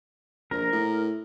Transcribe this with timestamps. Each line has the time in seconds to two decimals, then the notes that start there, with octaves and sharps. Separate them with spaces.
0.51 A#1 A#4
0.72 A2